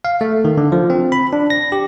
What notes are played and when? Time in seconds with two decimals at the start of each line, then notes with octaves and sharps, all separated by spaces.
0.05 F5
0.21 A3
0.45 D#3
0.58 D3
0.72 F3
0.90 C4
1.12 B5
1.33 D4
1.50 A#6
1.72 G4